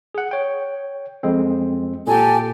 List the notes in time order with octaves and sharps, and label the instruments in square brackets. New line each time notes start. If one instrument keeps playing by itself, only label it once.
[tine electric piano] G#4 F#5
C#5 G5
F2 G#3 C4
[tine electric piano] A#2 [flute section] G4 A4 G#5